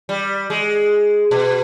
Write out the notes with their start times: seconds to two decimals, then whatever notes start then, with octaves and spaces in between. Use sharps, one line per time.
0.09 G3
0.50 G#3
1.31 B2